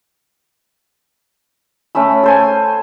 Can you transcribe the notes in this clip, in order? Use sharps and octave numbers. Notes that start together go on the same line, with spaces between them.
A3 C#4 B5 E6
A4 C5 G#5